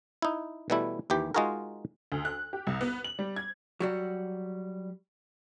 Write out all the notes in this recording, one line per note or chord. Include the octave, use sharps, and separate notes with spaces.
D#4 E4
B2 E3 G3 A3 E4
D#2 E3 G4
G#3 D#4 F4 F#4 G#4 A#4
D2
F#6
G4
C2
B3
F#7
G3
G#6
F#3 G3 F#4